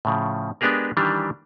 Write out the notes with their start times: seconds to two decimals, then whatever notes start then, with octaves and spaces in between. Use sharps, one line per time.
0.05 A2 C#3 F3
0.61 G#3 B3 D4 G4 G#4 A#4
0.97 D#3 E3 G3 D4 G4